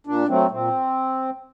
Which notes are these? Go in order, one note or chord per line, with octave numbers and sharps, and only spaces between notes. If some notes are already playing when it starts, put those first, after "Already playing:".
A#2 D4
F#3 A3 C4
A#2 C4